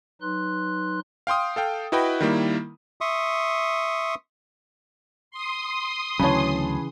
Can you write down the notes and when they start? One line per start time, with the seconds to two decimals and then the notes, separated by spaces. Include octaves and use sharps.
0.22 F#3 D#4 B4 C6 F#6
1.27 F5 G5 C6 D#6
1.56 A4 F5 G5
1.92 E4 F#4 B4 D#5 G5 B5
2.21 D#3 G3 A#3 E4
3.01 E5 C6 C#6 D#6
5.31 C6 D#6
6.19 D2 C#3 E3 F#3 C#5 A5 B5